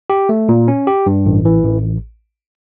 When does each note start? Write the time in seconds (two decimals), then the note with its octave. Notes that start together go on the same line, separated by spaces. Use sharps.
0.10 G4
0.29 A3
0.49 A#2
0.68 C#4
0.87 G4
1.06 G2
1.26 A1
1.45 E3
1.65 A1